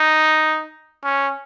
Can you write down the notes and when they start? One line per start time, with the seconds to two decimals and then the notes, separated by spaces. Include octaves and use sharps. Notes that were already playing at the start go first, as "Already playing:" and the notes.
Already playing: D#4
1.04 C#4